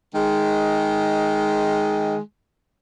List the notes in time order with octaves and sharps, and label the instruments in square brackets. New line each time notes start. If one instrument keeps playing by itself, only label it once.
[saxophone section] D#3 G#3